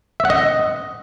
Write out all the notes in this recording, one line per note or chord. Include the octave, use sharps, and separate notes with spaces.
E5
F#5
D#5